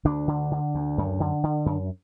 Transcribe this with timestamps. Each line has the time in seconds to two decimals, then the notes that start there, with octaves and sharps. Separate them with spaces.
0.05 D2 D3 D4
0.28 D3
0.51 D3
0.75 D2
0.98 F#2
1.20 D3
1.43 D3
1.66 F#2